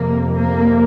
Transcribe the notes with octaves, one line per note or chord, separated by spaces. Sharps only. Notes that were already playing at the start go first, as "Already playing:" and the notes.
Already playing: F2 C3 A#3
A#3